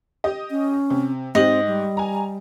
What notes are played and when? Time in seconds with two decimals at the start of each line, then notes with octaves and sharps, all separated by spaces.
0.24 G4 D#5
0.51 C#4
0.90 C3
1.35 G#2 C4 G4 D#5 F#7
1.67 G3
1.97 G#5 A#5